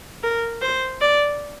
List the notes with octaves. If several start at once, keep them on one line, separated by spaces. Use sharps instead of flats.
A#4
C5
D5